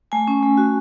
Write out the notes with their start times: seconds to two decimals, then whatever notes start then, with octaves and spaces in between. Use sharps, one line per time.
0.12 A3 G#5
0.28 C#4
0.43 A3
0.58 F#4